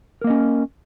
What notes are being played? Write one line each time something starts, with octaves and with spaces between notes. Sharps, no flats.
A#3 C#4 A#4 D#5